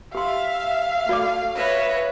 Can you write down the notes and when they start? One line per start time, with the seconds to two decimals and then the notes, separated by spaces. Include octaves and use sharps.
0.15 G4 E5 F5 C6
1.09 A3 F#4 D5 D6
1.56 B4 C#5 D#5 E5